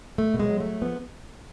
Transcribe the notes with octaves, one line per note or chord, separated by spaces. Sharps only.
B2 A3
B2
G#3
F#3
A3
F#3
F3 B3